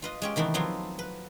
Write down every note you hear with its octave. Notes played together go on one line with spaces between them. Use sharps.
F4 B4 D#5
G#3 C#4 G4
C3 D#3 E3 A3 B3
F3 F#3 B3 C4 F4
B4